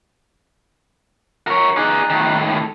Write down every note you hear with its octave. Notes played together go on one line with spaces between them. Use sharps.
A#4 C#5
D#4 G#4 D5 F#6
A2 D#3